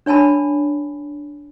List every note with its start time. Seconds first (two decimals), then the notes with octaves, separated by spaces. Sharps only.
0.06 D4 C#5 G#5 A5 B5